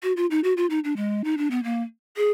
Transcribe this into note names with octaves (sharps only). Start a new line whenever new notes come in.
F#4
F4
D#4
F#4
F4
D#4
D4
G#3
D#4
D4
B3
A#3
G#4